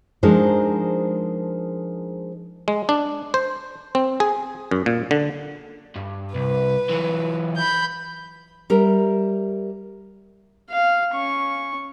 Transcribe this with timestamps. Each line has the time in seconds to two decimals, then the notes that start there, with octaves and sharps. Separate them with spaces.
0.23 F3 G#3 D4 D#4 A#4 C5
2.68 G#3
2.89 D4
3.34 C5
3.95 C4
4.20 G#4
4.71 F#2
4.86 A#2
5.11 D3
5.96 G2
6.35 C2 B4
6.90 E3 F#3
7.56 B5 G6
8.70 G3 A#4 E5
10.70 F5
11.12 C#4 C#6